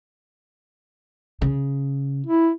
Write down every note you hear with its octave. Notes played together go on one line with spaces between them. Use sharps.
C#3
E4